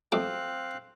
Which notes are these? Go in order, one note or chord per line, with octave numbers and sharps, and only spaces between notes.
F2 A3 C4 F5 D6 F#6